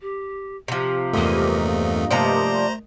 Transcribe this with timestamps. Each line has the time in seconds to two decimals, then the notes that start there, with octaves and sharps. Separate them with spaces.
0.01 G4
0.68 C3 F3 G4
1.13 E2 G2 A3 A#3 D#5
2.11 C3 F3 A3 C5 D5 A#5